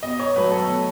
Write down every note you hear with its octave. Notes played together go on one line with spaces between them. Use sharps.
B2 D#5
C#5
F#3 A3 B4
A4
B2